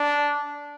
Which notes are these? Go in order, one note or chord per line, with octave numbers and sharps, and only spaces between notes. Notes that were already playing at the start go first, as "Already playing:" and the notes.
Already playing: D4